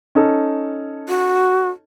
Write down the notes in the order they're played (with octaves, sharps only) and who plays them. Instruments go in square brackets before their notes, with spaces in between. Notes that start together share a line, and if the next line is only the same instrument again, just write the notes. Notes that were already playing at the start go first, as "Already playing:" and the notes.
[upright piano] C#4 D#4 A4
[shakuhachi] F#4